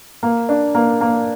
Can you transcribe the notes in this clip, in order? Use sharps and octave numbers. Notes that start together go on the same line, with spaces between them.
A#3
D4
A#3
A#3